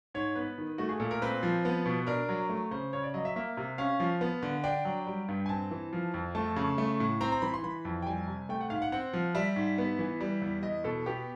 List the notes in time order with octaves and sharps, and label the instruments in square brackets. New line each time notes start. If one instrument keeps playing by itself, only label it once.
[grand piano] G#2 C#5
B3 B4
D#3
A3 F#4
G#4
A#2 A4
A#4
C4 B4
F3
B3
B2
D4 A#4
F#3
A3
C#3 C5
C#3 C#5
D5
F#3 D#5
E5
A#3 E5
C3
C#4 F5
F3
B3
D3
D4 G5
F#3
G3
G2
G#5
C4 A5
E3
F3
F2
A3 A5
C#3
A3
A2
C4 A#5
A#5
E3 B5
C6
E3 B5
F2
G5
G3 G#5
C3
A3 G5
F#5
G#2 F5
F#5
C4 F#5
F3
G3 E5
G#2
B3
E3
G3
E2
E2 D#5
B2 A4
B3 G4